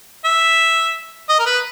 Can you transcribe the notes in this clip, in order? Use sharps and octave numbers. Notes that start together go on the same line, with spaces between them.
E5
D#5
A#4
B4